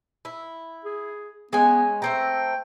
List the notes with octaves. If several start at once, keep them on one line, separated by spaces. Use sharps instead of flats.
E4
G#4
G#3 B3 C#4 G#5
A3 C4 G5 A#5